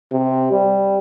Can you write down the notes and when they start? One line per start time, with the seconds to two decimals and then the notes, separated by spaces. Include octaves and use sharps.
0.12 C3
0.51 G3